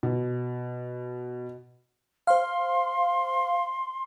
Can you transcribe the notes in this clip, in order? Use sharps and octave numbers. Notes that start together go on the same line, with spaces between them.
B2
C5 F5 C6